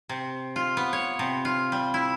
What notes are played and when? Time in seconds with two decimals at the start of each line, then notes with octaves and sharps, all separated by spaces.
0.09 C3
0.56 F4
0.77 B3
0.93 C#5
1.19 C3
1.45 F4
1.72 G3
1.94 E4